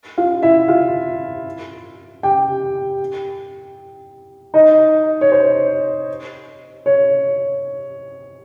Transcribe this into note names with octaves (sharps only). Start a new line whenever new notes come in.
F4 F5
E4 E5
F4 F5
G4 G5
D#4 D#5
C#5
C5
C#5